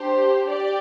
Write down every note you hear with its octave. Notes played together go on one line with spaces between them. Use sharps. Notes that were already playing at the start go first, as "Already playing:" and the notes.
Already playing: D4 G4 C5
G4 D5